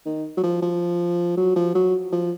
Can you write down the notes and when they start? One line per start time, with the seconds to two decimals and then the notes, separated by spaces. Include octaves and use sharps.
0.06 D#3
0.37 F#3
0.44 F3
0.62 F3
1.37 F#3
1.56 F3
1.75 F#3
2.12 F3